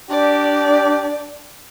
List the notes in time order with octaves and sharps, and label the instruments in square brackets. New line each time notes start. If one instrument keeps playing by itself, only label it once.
[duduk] D4 [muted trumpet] G4 [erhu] D5